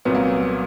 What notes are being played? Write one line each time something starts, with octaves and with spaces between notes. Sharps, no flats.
C2 A#2 F#3 B3
A#3